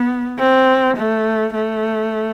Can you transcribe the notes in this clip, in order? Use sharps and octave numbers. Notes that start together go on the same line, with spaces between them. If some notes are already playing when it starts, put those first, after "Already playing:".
Already playing: B3
C4
A3
A3